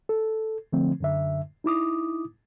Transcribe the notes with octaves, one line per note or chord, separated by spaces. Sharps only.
A4
D3 F3 A3 C4
F#2 D3 E5
D#4 E4 D6 D#6